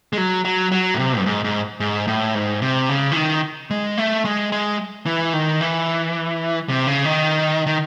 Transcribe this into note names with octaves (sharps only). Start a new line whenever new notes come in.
G#3
F#3
F#3
F#3
A2
C3
F#2
G#2
G#2
G#2
A2
G#2
C3
C#3
E3
D#3
G#3
A3
G#3
G#3
E3
D#3
E3
C3
C#3
D#3
D#3